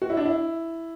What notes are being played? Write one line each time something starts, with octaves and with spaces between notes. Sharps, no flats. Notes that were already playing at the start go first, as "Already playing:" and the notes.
F#4
E4
D4
E4